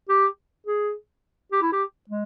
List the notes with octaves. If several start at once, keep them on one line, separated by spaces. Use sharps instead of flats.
G4
G#4
G4
E4
G4
G#3